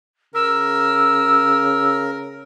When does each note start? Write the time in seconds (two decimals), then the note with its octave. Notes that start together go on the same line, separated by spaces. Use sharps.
0.34 C#3 A#4 E6